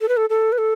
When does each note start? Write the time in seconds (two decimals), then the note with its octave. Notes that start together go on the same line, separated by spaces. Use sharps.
0.01 A4
0.09 B4
0.17 A4
0.30 A4
0.52 B4
0.58 A4